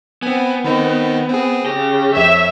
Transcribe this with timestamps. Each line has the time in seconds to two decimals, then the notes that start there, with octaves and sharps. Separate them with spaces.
0.23 B3 C4 G#5
0.64 D#3 C4 D#4
1.29 C4 G#4
1.66 C#3 G4 A#6
2.15 F2 C#5 E5